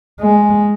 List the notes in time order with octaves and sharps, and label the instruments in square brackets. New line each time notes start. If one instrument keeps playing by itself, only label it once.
[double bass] G#3